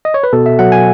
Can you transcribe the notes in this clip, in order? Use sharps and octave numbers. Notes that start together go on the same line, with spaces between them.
D#5
C#5
B4
B2 A4
E5
F#3 F#5
G#5